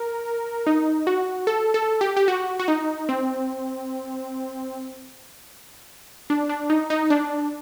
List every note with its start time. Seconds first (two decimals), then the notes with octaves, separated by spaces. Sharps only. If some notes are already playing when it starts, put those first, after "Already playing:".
Already playing: A#4
0.67 D#4
1.07 F#4
1.47 A4
1.74 A4
2.01 G4
2.16 G4
2.28 F#4
2.59 F#4
2.68 D#4
3.09 C4
6.30 D4
6.49 D4
6.70 D#4
6.90 D#4
7.10 D4